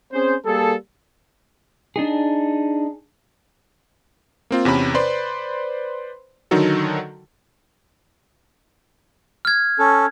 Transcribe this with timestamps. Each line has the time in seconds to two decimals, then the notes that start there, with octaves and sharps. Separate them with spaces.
0.13 C4 C#4 G#4 C5
0.46 G3 A#3 G#4 A4
1.96 D4 D#4 G#4
4.51 A#3 C4 F4
4.65 E2 C3 C#4 B5
4.94 B4 C5 D5 B5 C6
6.51 D3 D#3 F#3 D#4 F#4 A4
9.45 F6 G#6
9.79 C#4 A4